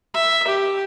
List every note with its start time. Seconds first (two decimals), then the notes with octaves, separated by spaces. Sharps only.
0.14 E5
0.48 G4